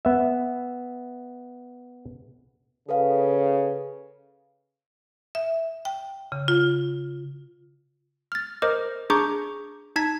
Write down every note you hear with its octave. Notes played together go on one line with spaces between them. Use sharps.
B3 E5
C#3 A4 B4 F5
E5
G5
C#3
F4
F6 A6
A#4 C5 D#5 D6 F6
D4 G#4 A#5 C#6 D6 G6
D#4 A5 G#6 B6